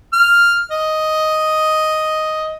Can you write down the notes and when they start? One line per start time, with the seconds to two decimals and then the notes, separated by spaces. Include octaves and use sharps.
0.13 F6
0.71 D#5